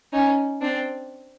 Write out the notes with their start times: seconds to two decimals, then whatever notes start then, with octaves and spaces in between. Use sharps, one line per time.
0.12 C#4 D#4
0.61 C4 D4